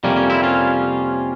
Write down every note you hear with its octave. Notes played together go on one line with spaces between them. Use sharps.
F2 C3 G3 A#3 C#4
C#4
C4 E4
C#4 F4